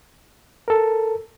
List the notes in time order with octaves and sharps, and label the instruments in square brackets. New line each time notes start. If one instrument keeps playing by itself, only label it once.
[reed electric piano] A4 A#4